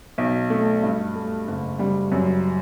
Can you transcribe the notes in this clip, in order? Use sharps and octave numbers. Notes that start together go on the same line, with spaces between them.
B1
A3
G2
A3
F#1
G3
F#2